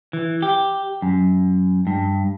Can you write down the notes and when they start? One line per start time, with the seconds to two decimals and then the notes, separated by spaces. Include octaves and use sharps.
0.13 E3
0.42 G4
1.02 F#2
1.87 G2